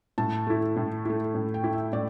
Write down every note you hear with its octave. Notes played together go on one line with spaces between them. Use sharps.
A2 A5
A3 E4
A2
A3 E4
A2
G5
A3 E4
E5
A2 D5